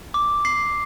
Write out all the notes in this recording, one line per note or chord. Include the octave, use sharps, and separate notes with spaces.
D6
C7